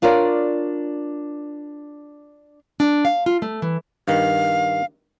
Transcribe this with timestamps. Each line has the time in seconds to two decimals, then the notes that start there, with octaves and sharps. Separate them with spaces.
0.02 D4 F4 A#4 C#5 D5
2.80 D4
3.05 F5
3.26 F4
3.42 A3
3.62 E3
4.08 G2 D#3 F5